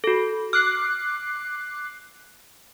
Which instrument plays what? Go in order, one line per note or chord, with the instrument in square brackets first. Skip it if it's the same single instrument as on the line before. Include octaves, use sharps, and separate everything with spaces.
[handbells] F#4 A4
[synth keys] D6 F#6 C7 [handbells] F6